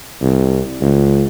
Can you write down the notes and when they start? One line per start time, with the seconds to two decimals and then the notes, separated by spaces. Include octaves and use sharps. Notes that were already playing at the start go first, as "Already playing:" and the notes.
0.21 C2
0.81 C#2